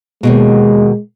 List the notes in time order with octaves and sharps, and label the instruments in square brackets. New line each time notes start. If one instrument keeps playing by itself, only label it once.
[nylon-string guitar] D#2 G#2 B2 [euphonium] G#3